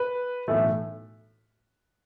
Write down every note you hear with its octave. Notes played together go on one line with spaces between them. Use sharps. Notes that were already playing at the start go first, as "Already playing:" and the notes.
Already playing: B4
B1 A2 E3 A3